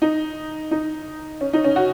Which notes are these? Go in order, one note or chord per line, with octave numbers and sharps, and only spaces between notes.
D#4
D#4
C#4
D#4
C#4
F#4